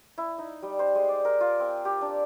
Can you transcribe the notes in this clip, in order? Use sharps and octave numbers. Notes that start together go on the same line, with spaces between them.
E4
D#4
G3
C5
G#3
D5
A#4
F4
C4
G4
D4